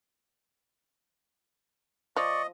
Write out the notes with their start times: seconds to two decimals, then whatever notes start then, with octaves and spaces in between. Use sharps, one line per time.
2.16 F3 D5 D#5 C#6